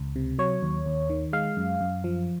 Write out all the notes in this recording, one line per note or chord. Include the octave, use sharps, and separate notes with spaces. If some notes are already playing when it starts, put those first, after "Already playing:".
Already playing: C#2
C3
F#3 C#5
D#2
D#2
D#3
G#3 F5
F#2
F#2
F3